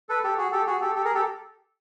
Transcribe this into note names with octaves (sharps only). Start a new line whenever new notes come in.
A4 B4
G4 A4
F#4 G#4
G4 A4
F#4 G#4
G4 A4
G4 A4
G#4 A#4
G4 A4